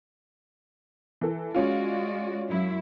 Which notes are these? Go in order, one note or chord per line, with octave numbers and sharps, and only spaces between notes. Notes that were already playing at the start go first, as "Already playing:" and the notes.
E3 A4
G#3 C#4 F4 F#4 D5
F#2 E4